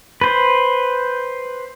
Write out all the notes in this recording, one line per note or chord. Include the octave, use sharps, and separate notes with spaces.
B4 C5